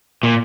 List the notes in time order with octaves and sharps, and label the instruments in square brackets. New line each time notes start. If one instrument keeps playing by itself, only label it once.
[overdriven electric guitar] A#2